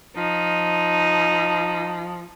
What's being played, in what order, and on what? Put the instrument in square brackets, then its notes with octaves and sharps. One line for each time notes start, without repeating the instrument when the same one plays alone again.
[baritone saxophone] F3 [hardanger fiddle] D#4